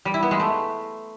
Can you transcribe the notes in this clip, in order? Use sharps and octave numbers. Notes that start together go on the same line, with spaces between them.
G3
E4
B3
G#3
A3